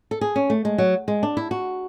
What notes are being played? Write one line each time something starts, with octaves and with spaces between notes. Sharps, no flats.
A4
G#4
C#4
A3
G#3
F#3
G#3
D4
E4
F#4